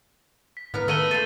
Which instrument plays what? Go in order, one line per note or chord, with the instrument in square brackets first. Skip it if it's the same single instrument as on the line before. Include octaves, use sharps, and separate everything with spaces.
[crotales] B6
[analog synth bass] A2 [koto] B3 A#4 A#5
[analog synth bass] D#3 [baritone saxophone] A3 [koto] B3 D#5 [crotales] E6 D#7 G7
[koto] A4 C5 [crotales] A6 D#7